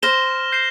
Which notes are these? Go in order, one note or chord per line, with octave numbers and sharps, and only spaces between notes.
C5 F6 A#6 E7 G7
G6 C7 E7